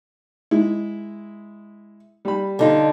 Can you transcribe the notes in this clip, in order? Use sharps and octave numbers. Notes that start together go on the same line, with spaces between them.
G#3 E4
G3 B5
D3 D#4 F4